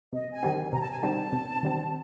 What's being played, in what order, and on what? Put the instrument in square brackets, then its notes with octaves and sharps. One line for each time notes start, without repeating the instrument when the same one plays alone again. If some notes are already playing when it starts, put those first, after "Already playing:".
[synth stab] C3 [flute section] D#5
[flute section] G#5
[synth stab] D#3 G3 C4
[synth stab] C3 [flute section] A#5
[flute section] A5
G#5
[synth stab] D#3 G3 C4 [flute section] A5
[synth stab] C3
D#3 G3 C4